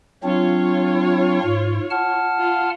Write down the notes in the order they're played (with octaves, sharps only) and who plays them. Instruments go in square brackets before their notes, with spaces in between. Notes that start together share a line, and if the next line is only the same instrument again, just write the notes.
[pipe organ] F#3 C4 D4 [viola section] F4 C#5
[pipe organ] G#2
F#5 A5 F6
[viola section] F4